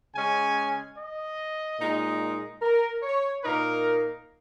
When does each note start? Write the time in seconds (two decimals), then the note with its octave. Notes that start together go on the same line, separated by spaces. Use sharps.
0.15 C#3 G#3 C#4 G#5
0.98 D#5
1.80 A#2 G#3 D#4
2.62 A#4
3.03 C#5
3.44 A#2 A#3 D#4 A#4